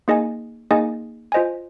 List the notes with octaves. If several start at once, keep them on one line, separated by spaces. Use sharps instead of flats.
A#3 D#4 G#4 D#5 G#5
A#3 D#4 G#4 D#5 G#5
F4 C5 D#5 G#5